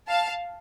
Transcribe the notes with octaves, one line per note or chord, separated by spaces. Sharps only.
F5 A5